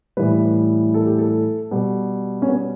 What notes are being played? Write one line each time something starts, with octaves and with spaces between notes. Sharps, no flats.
A2 E3 G3 B4
A4
G4
A4
B2 G3
C#4
B3